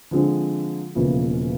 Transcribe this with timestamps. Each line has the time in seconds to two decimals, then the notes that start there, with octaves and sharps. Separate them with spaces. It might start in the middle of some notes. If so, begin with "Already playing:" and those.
0.11 D3 F3 G#3 C4
0.95 E1 E2 C#3 F3 A#3